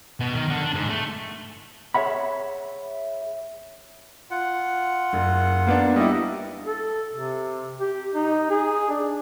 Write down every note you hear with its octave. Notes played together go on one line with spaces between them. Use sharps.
B2
D#3
D3
D4
G#2
A3
G#4 C#5 E5 F#5 B5
F4 F#5
F#1
A#3 B3 D4
G3 E4 G4 D#5
A4
C3
G4
D#4
G#4
D4